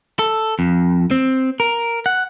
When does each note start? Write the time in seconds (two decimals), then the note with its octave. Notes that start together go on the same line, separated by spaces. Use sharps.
0.19 A4
0.59 F2
1.11 C4
1.60 A#4
2.06 F#5